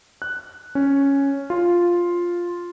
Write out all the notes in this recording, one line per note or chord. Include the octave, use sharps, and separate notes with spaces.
F#6
C#4
F4